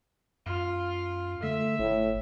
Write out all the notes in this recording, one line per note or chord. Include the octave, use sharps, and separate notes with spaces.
F#2 F4
D3 A3 E5
G1 A2